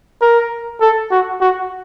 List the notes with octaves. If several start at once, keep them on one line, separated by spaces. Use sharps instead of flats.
A#4
A4
F#4
F#4